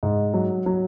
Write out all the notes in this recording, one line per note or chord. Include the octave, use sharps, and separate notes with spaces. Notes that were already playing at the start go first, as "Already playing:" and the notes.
G#2
F#3
F#3